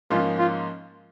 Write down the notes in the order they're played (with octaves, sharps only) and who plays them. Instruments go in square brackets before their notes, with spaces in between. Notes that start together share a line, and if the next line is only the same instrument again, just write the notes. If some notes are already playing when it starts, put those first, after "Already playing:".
[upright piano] G#2 F3 A#3 C#4 [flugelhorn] F4
[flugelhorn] F4